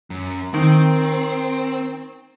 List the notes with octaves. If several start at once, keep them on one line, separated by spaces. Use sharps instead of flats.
F#2
D#3 C4